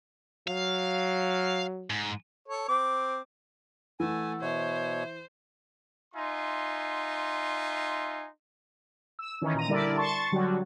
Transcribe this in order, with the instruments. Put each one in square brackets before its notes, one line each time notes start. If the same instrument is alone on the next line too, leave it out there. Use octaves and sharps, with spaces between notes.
[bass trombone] F#3 [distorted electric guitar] F5
[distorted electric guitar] G#2
[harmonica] A4 C#5
C4 D6
[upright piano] E3 [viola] A3 [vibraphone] F#5 E6 [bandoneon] G#5
[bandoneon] B2 C#5 [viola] C5 [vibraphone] E5
[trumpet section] D#4 F4 E5 G#5 C6
[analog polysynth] E6
D#3 E3 C#4
A#2 A#5 D#7
D3 G3 E4 A#4 D5
A5 C6 C#6 A6
D3 F#3 G3 F#4